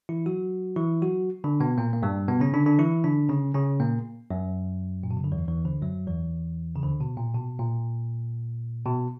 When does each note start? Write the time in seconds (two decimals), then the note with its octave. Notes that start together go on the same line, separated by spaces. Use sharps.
0.09 E3 E4
0.26 F#3 F#4
0.76 E3 E4
1.02 F#3 F#4
1.44 D3 D4
1.60 B2 B3
1.78 A#2 A#3
1.93 A#3
2.03 G2 G3
2.28 B2 B3
2.40 C#3 C#4
2.54 D3 D4
2.66 D3 D4
2.78 E3 E4
3.04 D3 D4
3.29 C#3 C#4
3.54 C#3 C#4
3.80 A#2 A#3
4.31 F#2 F#3
5.03 A#2
5.11 B2
5.17 C#3
5.24 D3
5.32 E2 E3
5.48 E2 E3
5.65 D2 D3
5.82 F#2 F#3
6.07 E2 E3
6.76 C#3
6.83 D2 D3
7.00 B2
7.17 A#2
7.35 B2
7.59 A#2
8.86 B2